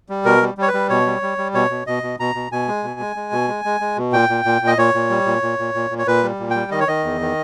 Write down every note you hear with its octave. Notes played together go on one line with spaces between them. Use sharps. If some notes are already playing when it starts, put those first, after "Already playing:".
G3
B2 A#4
G3
G3 C#5
B4
G3
B2 C#5
G3
G3
G3
B2 C#5
B2
B2 D#5
B2
B2 A#5
B2
B2 G#5
G#3
B2
G#3
G#3
B2
G#3
G#3
G#3
B2
A#2 G5
A#2
A#2
A#2
D#5
A#2 C#5
A#2
G3
A#2
A#2
A#2
A#2
A#2
C#5
A#2 B4
G3
A#2
G5
G3
D#3 D#5
C#5
D#3 D#5
E2
D#3